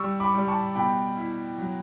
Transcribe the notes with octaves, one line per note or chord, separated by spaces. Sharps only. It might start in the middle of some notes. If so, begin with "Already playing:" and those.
Already playing: G3 C#6 E6
B5 D6
G3
A5 C#6
B2 G5 B5
E4
F#3